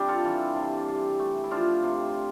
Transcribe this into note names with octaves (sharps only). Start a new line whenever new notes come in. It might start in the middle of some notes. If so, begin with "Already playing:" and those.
Already playing: C3 G3 D4 G4
F4 A4
E3
C3
C3
A3
E4
F3 D4 F4
C3